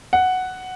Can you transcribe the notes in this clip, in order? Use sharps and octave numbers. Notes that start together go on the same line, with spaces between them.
F#5